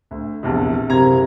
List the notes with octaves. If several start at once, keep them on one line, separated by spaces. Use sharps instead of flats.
D2
A#1 E2 C3
F#1 C3 A#5 G#6